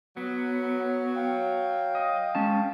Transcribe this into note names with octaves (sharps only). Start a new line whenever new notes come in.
F#3 B3
F5 G5
D#5
G#3 C#4 A5